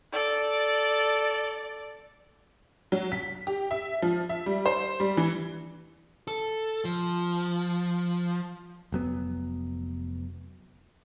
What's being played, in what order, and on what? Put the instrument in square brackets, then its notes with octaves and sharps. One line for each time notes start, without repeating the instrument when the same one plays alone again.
[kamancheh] A4 D5
[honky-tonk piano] F#3
B6
G4
E5
F3
E5
G3
C5
G3
E3
[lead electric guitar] A4
F3
[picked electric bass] F1 F#3 B3